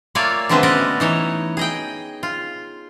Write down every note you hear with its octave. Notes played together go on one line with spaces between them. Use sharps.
A3 A#3 F4 C#5 D5 G#5
D3 G#3 A3 B3 C4 B4
C#4 F#4 B4 D5 D#5
E3 D#4 C#5
G#4 D#5 G5
F4